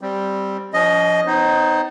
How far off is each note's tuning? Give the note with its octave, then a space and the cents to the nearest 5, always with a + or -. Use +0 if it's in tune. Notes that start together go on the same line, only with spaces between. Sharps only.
G3 +0 C4 +0
F3 +0 C#4 +40 D#5 +0
B3 +45 D#4 +0 C5 +30